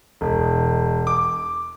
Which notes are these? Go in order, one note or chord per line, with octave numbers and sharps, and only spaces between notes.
E1
D6